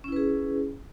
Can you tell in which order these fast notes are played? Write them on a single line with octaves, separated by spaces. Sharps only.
C#4 E4 B4 G#4